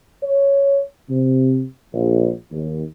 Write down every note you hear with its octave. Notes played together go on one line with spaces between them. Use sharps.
C#5
C3
A#1
D#2